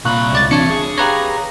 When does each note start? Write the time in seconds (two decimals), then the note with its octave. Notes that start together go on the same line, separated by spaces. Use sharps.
0.05 C2 A#2 F5 B5 C#6 F#6
0.33 C#2 D5 A6
0.51 E3 C4 D4 C#5 A5 C#7
0.70 G#4
0.98 G4 B4 C#5 F5 A#5 A#6